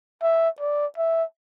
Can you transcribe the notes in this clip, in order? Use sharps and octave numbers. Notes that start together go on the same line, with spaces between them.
E5
D5
E5